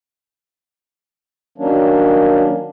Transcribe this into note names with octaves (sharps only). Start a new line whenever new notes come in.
D#3 F#3 A#3 C#4 D4